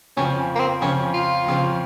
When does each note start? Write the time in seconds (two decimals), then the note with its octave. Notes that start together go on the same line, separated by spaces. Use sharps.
0.17 F2 C#3 F3 C#4
0.55 A#3
0.60 C4
0.81 F2 C#3 F3 C#4
1.14 F4
1.46 F2 C#3 F3